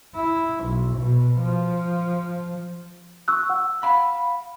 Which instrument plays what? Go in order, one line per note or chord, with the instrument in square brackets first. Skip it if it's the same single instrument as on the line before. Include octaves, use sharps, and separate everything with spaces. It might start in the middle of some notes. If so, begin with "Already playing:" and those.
[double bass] E4
B1
B2
F3
[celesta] C#6 E6 F#6
F#5
[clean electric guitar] F5 B5